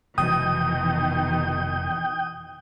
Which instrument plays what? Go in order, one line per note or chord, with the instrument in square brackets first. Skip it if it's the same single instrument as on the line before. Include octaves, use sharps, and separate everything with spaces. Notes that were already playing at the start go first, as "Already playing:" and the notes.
[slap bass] F1 [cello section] B2 D#3 E3 [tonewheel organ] G5 [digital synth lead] D#6